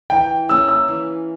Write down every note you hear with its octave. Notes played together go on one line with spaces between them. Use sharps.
E3 G5
A#3 C#4 E4 E6
E6
E3